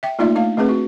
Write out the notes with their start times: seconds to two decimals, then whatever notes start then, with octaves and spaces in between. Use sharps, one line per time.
0.03 E5 G5
0.19 A3 A#3 D#4 F4 D5 E5
0.36 A3 D4 F5
0.57 A3 C4 D4 G#4 B4
0.69 F#4